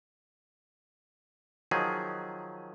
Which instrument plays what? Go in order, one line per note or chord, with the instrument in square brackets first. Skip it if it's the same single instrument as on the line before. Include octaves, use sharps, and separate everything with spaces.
[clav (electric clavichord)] D#3 F3 F#3 G#4